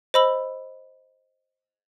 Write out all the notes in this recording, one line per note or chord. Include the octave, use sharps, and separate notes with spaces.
C5 D#5 B5 E6 F#7